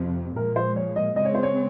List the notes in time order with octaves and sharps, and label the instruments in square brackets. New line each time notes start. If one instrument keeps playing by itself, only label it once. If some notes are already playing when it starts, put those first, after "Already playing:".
Already playing: [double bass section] F2 C3 F3
[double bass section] A#2 F3 G#3 [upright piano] A#4
[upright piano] C5
C#5
D#5
[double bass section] C#3 G#3 C4 [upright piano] D#5
[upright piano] C#5
C5
C#5